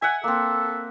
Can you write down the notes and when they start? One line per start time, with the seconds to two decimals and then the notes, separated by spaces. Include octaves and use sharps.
0.02 E5 F#5 G#5
0.24 A#3 C4 A4